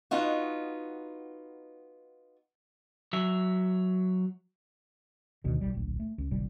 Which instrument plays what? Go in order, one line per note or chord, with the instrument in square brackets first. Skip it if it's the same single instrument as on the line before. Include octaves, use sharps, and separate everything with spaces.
[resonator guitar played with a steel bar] B3 D#4 F4 F#4
[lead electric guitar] F#3 E5
[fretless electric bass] D2 B2 D3 D#3
B1 F#2 G3
D1 A#1
A3
C#2
D#1 A1 C3 G3